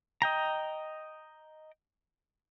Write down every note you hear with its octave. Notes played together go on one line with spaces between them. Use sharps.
D#5 G5 A#5